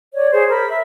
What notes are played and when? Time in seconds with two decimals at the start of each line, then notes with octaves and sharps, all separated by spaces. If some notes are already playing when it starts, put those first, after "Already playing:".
0.13 C#5 D5
0.31 G#4 C5 C#5
0.48 A#4 B5
0.69 E5